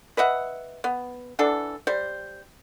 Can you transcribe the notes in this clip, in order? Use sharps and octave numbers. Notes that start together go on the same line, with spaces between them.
B4 D#5 E5 F#5
B3
D3 E3 D4 A4
G3 C5